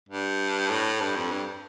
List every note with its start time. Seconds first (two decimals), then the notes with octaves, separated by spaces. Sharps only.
0.09 G2
0.70 A2
1.01 G2
1.16 F2
1.31 G2